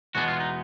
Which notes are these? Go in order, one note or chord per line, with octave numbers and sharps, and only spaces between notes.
E2 B2 G#3 B3 D4 F#4
F4
D#4